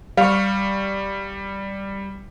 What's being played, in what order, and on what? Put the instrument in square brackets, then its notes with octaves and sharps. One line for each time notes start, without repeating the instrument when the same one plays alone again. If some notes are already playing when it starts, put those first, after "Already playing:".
[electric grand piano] G3 [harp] F5 C#6